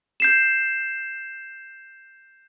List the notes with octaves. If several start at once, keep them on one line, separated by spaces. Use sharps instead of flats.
G6 C7 E7